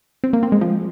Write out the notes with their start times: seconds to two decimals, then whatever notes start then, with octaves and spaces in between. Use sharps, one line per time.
0.24 C4
0.33 A#3
0.43 C4
0.52 G#3
0.61 F3